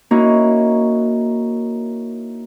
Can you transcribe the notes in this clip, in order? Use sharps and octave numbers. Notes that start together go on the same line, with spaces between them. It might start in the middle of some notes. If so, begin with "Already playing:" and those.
A#3 C#4 D#4 E4 F#4